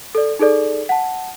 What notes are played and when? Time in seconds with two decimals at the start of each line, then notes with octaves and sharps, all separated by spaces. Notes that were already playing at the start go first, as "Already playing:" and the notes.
0.15 A4 D5
0.39 D#4 G#4 A4 D5
0.89 F#5 A5